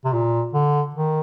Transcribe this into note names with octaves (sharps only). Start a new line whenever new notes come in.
C3
A#2
D3
D#3